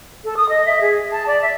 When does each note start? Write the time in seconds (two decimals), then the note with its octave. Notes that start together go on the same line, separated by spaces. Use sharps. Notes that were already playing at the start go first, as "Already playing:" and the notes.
0.24 A4
0.37 D#6
0.49 D#5
0.66 E5
0.81 G#4
1.12 A5
1.27 D5
1.42 E5